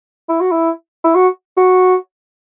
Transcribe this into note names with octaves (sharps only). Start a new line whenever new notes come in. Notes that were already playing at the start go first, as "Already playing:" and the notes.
E4
F#4
E4
E4
F#4
F#4